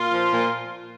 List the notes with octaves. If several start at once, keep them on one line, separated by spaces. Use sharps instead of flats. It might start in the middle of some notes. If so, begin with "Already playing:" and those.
Already playing: A#2 F4
F3
A#2